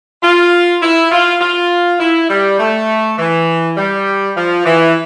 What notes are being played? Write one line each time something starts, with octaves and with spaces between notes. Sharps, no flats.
F4
E4
F4
F4
E4
G3
A3
E3
G3
F3
E3